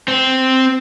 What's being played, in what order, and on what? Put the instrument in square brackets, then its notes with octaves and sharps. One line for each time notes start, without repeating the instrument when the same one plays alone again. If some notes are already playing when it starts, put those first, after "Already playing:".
[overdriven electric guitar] C4